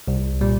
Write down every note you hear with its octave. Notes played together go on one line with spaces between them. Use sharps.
C2
A#2 G3